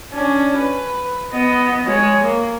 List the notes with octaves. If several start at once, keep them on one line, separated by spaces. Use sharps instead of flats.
C#4 D4
B4
B3 D#5
G#3 C#5
A#3